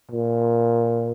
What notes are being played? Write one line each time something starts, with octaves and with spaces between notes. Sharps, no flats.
A#2